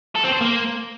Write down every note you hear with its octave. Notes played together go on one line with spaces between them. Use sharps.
A4
C4
C5
A#3